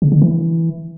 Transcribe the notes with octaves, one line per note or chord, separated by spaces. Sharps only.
C#3
D3
E3